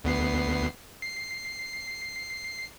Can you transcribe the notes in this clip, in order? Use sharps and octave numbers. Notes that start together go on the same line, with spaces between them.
D2 B3 C7
C7